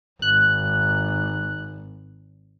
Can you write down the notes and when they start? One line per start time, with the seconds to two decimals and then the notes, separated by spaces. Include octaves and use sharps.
0.22 G#1 F#6